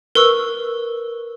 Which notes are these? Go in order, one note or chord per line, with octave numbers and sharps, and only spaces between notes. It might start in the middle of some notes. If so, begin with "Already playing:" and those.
A#4 B4 C#6 E6